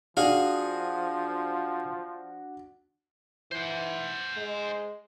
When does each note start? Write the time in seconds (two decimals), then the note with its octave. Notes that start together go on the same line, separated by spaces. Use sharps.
0.17 F3 D4 F#4 G#4 D5 F5
3.52 E3 C5 F#5
4.37 G#3